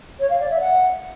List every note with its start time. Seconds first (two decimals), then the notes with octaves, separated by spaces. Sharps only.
0.20 C#5
0.30 F5
0.40 D5
0.50 E5
0.60 F#5